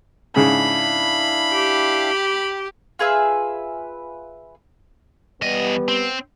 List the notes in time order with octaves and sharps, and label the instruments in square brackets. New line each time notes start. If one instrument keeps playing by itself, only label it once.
[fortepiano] G#2 C#3 [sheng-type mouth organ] D4 E4 F5 [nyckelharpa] B5
[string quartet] G4
[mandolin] F4 G#4 B4 E5
[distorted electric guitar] E2 D#5 [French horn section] G3 B3
[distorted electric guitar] C4